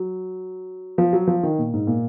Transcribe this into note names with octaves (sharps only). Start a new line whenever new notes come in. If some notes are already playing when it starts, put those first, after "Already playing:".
Already playing: F#3
F3
F#3
F3
D#3
A#2
G#2
A#2